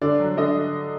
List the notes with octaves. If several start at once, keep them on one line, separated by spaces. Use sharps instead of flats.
D3 D5
F#3
D3 D#5